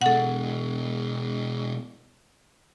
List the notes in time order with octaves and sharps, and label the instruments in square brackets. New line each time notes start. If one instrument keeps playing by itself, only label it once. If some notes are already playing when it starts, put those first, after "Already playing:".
[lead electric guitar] B2 G#3 [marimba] A4 F#5